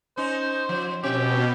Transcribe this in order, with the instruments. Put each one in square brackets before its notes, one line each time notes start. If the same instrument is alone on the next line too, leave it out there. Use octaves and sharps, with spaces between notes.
[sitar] C#4 D#4 [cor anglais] C5
[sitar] F3
[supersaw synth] B2 [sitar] C4 E5 [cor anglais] G4